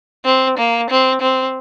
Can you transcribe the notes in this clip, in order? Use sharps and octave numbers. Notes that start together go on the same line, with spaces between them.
C4
A#3
C4
C4